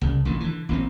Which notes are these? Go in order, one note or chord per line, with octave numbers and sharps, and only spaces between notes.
C2 C#3
A1 A#2 D3
D3 E3
A1 A#2 D#3 C4